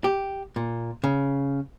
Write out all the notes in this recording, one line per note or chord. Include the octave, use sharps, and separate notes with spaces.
G4
A#2
C#3